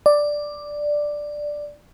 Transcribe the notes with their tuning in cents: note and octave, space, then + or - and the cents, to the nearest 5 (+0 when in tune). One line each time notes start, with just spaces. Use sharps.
D5 +5